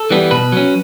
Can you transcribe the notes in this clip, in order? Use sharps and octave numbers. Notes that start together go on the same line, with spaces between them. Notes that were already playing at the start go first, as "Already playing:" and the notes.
Already playing: A4
E3 G3 B3
B2 B4
F#3 C#4